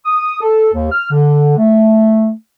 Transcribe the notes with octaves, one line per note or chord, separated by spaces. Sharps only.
D#6
A4
D#2
F6
D3
A3